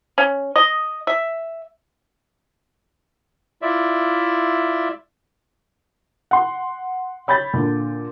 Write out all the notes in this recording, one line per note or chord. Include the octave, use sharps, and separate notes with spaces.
C#4
D#5
E5
E4 F4 D5 E5
F#5 C6
C#5 B5 G6 A6
A#2 D3